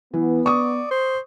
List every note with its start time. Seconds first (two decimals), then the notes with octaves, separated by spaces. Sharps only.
0.14 E3 B3
0.46 D5 C#6 D#6
0.91 C5